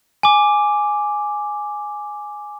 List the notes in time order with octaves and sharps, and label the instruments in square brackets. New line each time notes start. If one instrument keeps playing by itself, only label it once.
[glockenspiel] G#5 D6